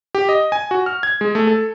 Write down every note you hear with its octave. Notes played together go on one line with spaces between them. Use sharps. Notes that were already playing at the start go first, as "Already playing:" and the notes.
G4
D#5
G#5
F#4
F6
G#6
G#3
A3
A4